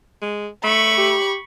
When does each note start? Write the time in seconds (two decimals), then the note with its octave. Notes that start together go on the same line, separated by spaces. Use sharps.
0.22 G#3
0.64 A3 B5 C#6
0.98 G4